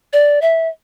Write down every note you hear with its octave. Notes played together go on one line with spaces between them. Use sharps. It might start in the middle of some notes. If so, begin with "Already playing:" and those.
D5
E5